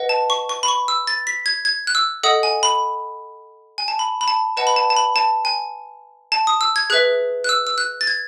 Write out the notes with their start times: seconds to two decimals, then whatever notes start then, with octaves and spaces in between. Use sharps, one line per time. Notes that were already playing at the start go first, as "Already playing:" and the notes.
Already playing: B4 D#5 F#5
0.09 A5
0.30 C#6
0.49 C#6
0.63 B5
0.68 C#6
0.88 E6
1.07 A6
1.27 B6
1.46 G#6
1.65 G#6
1.87 F#6
1.95 E6
2.23 A4 D#5 F#5 D#6
2.43 G#5
2.63 B5
3.78 G#5
3.88 A5
3.99 B5
4.21 B5
4.28 A5
4.57 B4 D#5 F#5 A5
4.67 B5
4.76 A5
4.90 A5
4.96 B5
5.16 A5
5.45 G#5
6.32 A5
6.47 D#6
6.61 E6
6.76 G#6
6.90 G#4 B4 E5 F#6
7.44 F#6
7.49 E6
7.67 E6
7.78 F#6
8.01 A6
8.07 G#6